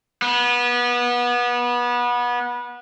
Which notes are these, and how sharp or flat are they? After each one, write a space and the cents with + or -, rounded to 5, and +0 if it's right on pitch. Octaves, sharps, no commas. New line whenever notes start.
B3 -25